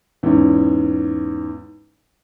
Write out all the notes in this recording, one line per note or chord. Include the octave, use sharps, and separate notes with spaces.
E2 G#2 C#4